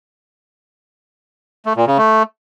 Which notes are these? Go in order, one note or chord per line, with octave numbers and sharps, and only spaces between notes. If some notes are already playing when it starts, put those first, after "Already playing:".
A3
A#2
C#3
A3